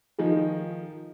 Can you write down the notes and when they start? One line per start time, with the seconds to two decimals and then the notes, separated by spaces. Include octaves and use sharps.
0.18 D#3 F3 D#4 G#4